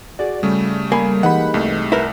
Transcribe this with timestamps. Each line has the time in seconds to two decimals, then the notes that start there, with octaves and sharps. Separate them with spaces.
0.19 F#4 G#4 D5
0.43 C#3 G3 A3
0.92 A#3 G#5 B5
1.23 E3 G3 G#3 D#4 F#5 B5
1.54 C2 A3
1.92 E4 A#4 B4